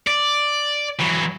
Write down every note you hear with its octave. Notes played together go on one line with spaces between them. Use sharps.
D5
E3 F#3